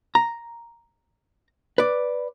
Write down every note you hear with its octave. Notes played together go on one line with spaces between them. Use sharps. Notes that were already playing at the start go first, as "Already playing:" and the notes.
A#5
B4 D5